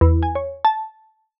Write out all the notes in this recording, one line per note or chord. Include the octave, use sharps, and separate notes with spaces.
E2
G#5
C#5
A5